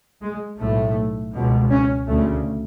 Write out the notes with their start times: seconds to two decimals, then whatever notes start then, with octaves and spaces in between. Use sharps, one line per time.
0.22 G#3
0.59 B1 A2 A3
1.33 C#2 B2
1.70 C#4
2.08 D2 C#3 A3